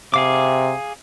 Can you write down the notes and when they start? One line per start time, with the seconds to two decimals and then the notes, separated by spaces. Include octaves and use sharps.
0.14 C3 G#4 F5 D6